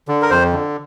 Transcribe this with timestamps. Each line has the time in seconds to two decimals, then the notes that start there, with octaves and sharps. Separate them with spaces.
0.08 D3
0.22 A#4
0.30 F2 C5
0.53 D3